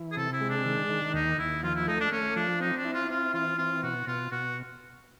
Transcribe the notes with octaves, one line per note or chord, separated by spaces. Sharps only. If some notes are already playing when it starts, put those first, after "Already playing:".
Already playing: E3
G#4
C3 A4
E4
G#3
D4
D#3
D#3
D#2 D#4
D#2 E4
F3 F4
E4
A3 D#4
D4
A3 C#4
F3 D4
C4 D#4
D4
E4
F4
C4 F4
E3 F4
C4 F4
B2 F#4
B2 F4
B2 F#4